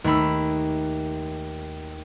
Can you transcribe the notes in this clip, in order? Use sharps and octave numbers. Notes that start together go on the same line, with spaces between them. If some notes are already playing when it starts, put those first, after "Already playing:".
D#2 A3 B5 E6